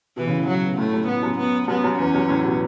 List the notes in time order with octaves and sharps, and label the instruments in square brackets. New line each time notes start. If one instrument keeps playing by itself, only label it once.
[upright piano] B2 [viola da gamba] E3
[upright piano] C#3
A2
[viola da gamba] F#3
[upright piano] B2
[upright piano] A2 [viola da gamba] A3
[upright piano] F#2
[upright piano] A2 [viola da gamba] B3
[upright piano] F#2
[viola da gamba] B3
[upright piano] F#2 [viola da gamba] B3
[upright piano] F#2
[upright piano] E2 [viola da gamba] C#4
[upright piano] F#2
A2
B2